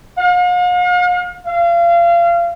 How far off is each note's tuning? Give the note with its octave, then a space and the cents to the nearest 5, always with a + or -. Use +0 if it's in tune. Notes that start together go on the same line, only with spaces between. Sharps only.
F5 +45
F5 -30